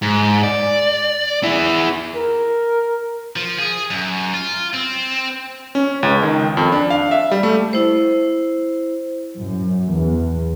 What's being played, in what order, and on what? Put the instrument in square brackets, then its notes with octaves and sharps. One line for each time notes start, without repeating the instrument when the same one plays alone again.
[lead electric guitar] G#2
D5
E4 G#4
[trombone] A#4
[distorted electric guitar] F3
G#4
F#2
F4
C4
[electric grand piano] C#4
C#2
D#3
F2
D4
F5
E5
G3
A3
[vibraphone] E4 C5
[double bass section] F#2
E2